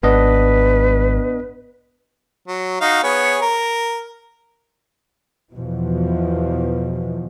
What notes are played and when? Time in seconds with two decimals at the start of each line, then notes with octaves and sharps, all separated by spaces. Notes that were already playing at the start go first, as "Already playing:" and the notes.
0.03 G#1 B3 D4 B4 D#5
2.48 F#3
2.81 D#4 F#4 F5
3.03 B3 G#4 C#5
3.42 A#4
5.56 E2 B2 E3 F3